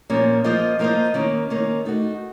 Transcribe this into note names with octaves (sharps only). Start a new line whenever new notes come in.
A#2 F3 A#3 C#4
F3 A#3 F4 C5 D#5
F3 A#3 F4 C5 D#5
D#3 A#3 C#4
D#3 A#3 C#4
A3 D#4 F#4